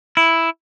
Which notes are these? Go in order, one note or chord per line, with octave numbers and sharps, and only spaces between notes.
E4